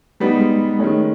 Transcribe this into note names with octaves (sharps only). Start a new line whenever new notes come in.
G3 A3 B3 D#4
G#3
D#3 G#3 A3 C#4